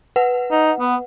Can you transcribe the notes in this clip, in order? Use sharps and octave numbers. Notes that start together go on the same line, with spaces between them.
B4 F#5
D#4
B3